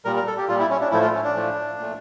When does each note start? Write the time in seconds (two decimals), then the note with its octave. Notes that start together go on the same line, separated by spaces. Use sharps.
0.05 A#2 G3 A#4
0.16 A#4
0.27 A4
0.38 G4
0.48 A#2 G3 F4
0.59 E4
0.70 C#4
0.81 D4
0.91 A2 F3 A3 E4
1.02 F4
1.13 C#4
1.24 D4
1.35 A2 F3 A3
1.78 A#2 A3